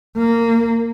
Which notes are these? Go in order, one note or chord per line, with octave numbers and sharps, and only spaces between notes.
A#3